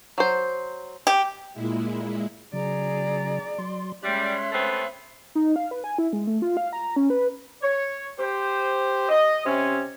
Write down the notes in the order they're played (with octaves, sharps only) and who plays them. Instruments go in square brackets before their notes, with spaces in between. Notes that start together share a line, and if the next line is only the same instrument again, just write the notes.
[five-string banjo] F#3 C5
[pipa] G4
[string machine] A#2 G#3 E4
[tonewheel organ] C#3 F#3 [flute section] G#4 A#5 [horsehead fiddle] D5
[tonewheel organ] F#3 C6
[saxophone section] G3 [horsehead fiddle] G#3 C#4 [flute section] C#5 E5 C6 [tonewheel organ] F#6
[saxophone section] A3 B3 C4
[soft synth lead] D#4
F5
B4
G#5
E4
G#3
A3
F4
F5
A#5
C#4
B4
[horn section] C#5
G4 C5
D#5
C3 C#4